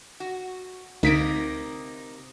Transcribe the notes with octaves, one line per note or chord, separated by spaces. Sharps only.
F#4
D2 C3 A#3 D#4 B6 D7